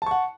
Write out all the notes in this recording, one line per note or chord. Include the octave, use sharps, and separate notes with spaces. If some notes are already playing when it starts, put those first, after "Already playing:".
F#5 A5 C#6